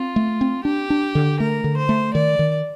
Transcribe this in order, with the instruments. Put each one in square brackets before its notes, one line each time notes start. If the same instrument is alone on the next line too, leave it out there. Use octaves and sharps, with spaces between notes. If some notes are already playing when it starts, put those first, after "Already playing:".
Already playing: [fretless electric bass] C4 [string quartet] F4
[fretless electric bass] A3
C4
[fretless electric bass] D4 [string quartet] G4
[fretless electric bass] D4
D3
[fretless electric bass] A3 [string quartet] A#4
[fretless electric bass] D3
[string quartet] C5
[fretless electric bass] A3
[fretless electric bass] D#3 [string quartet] D5
[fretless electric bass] D#3